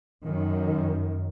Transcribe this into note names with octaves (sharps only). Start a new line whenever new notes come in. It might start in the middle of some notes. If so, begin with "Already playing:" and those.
F#2 D#3